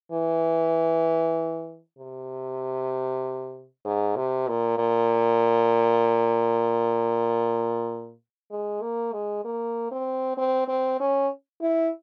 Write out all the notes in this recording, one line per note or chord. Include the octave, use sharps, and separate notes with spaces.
E3
C3
G#2
C3
A#2
A#2
G#3
A#3
G#3
A#3
C4
C4
C4
C#4
E4